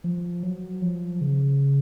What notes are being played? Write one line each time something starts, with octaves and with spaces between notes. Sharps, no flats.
F3
F#3
F3
C#3